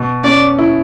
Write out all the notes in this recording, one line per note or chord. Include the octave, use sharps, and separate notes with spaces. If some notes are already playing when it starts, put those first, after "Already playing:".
Already playing: B2
C#4 D5
E4